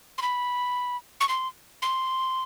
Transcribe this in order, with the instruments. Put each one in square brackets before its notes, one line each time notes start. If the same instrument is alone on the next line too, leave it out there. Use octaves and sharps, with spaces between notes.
[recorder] C6
B5
C#6
C6
C6